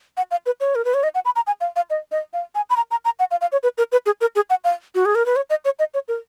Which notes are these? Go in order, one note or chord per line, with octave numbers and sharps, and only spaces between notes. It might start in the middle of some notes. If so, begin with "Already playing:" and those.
F#5
F5
B4
C#5
A#4
B4
C#5
D#5
F#5
B5
A#5
G#5
F5
F5
D#5
D#5
F5
G#5
B5
A#5
A#5
A#5
F#5
F5
F5
C#5
B4
A#4
B4
G#4
A#4
G#4
F#5
F5
F#4
G#4
A#4
B4
C#5
D#5
C#5
D#5
C#5
A#4